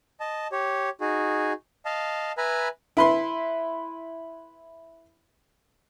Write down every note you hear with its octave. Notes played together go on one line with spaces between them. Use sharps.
D#5 A5
G4 C#5
D#4 F#4 G#4
D#5 F5 A5
B4 E5 G#5 A#5 B5
E4 B4 C6